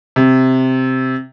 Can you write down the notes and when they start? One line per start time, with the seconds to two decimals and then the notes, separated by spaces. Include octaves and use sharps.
0.16 C3